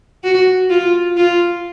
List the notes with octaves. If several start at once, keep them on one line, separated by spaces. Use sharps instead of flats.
F#4
F4
F4